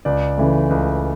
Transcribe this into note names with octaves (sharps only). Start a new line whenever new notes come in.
C#2 D5
C#3 E3 A3
C#2